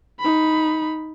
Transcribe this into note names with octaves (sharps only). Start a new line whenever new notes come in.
D#4 B5